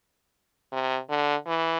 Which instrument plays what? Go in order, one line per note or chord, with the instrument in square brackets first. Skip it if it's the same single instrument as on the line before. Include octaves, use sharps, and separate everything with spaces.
[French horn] C3
D3
E3